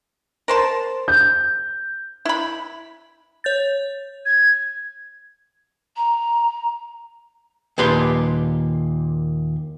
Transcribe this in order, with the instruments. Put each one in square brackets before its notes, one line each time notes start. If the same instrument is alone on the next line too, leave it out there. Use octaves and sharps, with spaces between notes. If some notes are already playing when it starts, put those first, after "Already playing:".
[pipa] A#4 C5 A5
[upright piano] G6
[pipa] E4 B5
[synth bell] C#5 G6 A6
[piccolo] G#6
[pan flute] A#5
[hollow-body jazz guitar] D#2 A#2 G4 B4 C6